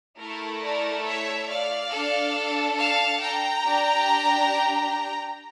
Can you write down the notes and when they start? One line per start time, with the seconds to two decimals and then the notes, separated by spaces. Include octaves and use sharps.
0.20 A3 E4 A4 A#4
0.63 A#4 D5
1.06 C#5 E5
1.49 D5 F5
1.93 D4 A4
2.79 F5 A5
3.22 G5 A#5
3.65 D4 G4